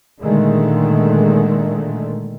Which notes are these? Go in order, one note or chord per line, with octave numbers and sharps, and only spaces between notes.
A#2 D3 D#3 G#3 A3